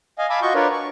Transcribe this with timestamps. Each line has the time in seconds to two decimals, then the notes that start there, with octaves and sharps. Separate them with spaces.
0.18 D#5 F5 G#5
0.30 F5 G#5 A5 B5 D6 E6
0.42 F4 F#4 D#5 C#6 G6
0.55 D4 F4 A#4 B4 C#5 D5
0.72 C#6